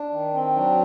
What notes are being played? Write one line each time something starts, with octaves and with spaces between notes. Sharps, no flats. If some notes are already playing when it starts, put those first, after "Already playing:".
Already playing: D4
D#3
C4
F#3 D4